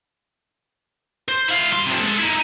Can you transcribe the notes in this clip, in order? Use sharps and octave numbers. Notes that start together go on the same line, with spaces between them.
C5
E4 F5
G2 C6
C3 F3
G#3 A4
D#4 E4